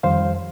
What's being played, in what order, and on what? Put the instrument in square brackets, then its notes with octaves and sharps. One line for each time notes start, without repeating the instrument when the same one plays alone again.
[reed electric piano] F2 D#3 G3 C5 F5